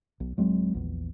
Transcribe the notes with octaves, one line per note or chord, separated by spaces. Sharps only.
B1
D1 F#3 G#3 C4
A#1 E2